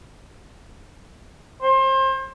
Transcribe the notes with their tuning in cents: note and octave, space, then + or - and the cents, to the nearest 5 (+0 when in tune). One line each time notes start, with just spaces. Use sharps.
C5 +30